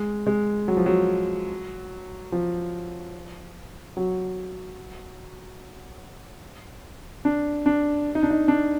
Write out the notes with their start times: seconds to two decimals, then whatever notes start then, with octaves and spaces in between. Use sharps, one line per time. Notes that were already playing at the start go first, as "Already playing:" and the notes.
Already playing: G#3
0.27 G#3
0.68 F#3
0.77 F3
0.86 F#3
2.32 F3
3.97 F#3
7.25 D4
7.66 D4
8.15 D#4
8.23 D4
8.31 D#4
8.48 D4